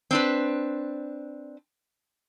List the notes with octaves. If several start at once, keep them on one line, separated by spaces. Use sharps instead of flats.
C4 D4 B4